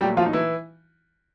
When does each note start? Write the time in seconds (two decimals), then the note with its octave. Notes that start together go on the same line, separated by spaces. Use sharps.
0.01 A#2 F#3 G3 A3 G4
0.17 F3 F4
0.26 D#4
0.33 E3 E4